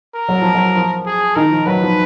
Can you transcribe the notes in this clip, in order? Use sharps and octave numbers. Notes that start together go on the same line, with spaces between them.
A#4
F#3
F3
F#3
F3
G#4
D#3 A#4
F3
F#3 B4
F3